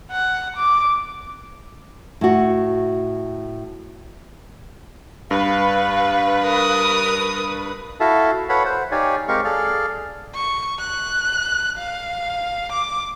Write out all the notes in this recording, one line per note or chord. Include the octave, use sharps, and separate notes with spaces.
F#5
D6
A2 F#4
G2 B4 F5
A#4 D#6
E4 F#4 A4 E5 F5 A5
A4 B4 C#5 F5 F#5 B5
C5 F#5
D#4 G4 C#5 D5 F5 G#5
G#3 C4 G4 A#4 F5 C#6
G#4 A4 D5 F5 F6
C#6
F#6
F5
D6